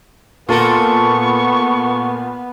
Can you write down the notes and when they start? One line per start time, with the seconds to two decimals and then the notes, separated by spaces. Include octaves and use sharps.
0.49 A#2 B3 F4 A4 A#4 C#6